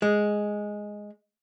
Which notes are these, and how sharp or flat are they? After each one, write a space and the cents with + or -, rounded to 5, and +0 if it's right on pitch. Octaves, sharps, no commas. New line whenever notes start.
G#3 +0